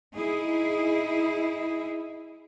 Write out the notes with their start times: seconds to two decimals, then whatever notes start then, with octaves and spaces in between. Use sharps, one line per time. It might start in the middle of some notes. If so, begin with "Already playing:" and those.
0.16 D#4 E4 G#4